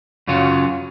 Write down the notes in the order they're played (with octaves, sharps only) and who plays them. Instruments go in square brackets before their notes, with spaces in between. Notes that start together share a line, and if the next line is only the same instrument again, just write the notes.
[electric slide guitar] F#2 C#3 F#3 C#4 F4